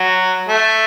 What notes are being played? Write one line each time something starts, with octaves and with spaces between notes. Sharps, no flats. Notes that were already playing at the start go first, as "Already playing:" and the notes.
Already playing: F#3
A3